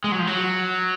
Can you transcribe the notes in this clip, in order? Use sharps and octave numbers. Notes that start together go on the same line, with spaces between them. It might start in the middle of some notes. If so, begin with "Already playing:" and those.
G#3
F#3
F3
F#3